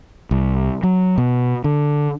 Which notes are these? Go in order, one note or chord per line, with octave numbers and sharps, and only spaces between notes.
C2
F#3
B2
D3